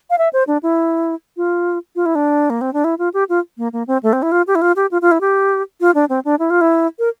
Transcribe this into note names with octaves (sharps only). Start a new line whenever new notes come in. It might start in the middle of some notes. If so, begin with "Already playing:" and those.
F5
E5
C5
D4
E4
F4
F4
E4
D4
A#3
C4
D4
E4
F4
G4
F4
A#3
A#3
C4
A3
C4
E4
F4
G4
E4
F4
G4
F4
F4
E4
G4
F4
D4
C4
D4
E4
F4
E4
A#4